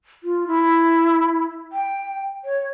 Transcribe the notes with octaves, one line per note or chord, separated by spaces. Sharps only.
F4
E4
G5
C#5